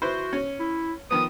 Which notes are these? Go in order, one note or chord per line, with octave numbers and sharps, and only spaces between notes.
E4 F#4 B4 C5
C#4
E4
D#3 F3 B3 D#6